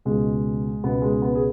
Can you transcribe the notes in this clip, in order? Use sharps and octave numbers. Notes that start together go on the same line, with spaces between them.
C#2 B2 G#3
C#2 B2 B3
G#3
B3
G#4